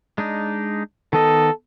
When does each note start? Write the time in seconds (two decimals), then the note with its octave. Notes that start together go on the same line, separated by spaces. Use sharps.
0.18 G#3 D4 D#4
1.13 D#3 B3 A4 D#5